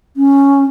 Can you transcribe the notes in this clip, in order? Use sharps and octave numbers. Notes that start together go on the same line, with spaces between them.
C#4